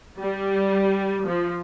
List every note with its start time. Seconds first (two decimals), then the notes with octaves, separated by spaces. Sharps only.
0.19 G3
1.28 F3